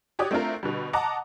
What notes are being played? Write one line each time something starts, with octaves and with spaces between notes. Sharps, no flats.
F#4 G4 C#5 D5 D#6
A3 C4 D4 E4 F4 A#4
B2 D3 G3
D#5 F#5 A5 A#5 D6